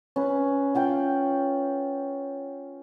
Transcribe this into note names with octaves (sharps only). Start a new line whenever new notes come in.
C#4 B4
F4 F#5 G5